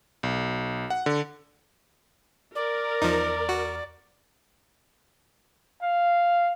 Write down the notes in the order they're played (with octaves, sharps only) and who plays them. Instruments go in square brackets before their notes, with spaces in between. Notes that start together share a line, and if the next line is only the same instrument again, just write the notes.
[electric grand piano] B1
F#5
D3
[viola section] A#4 [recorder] D5
[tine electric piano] E2 [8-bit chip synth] F3 D#4
[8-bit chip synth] F#4
[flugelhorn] F5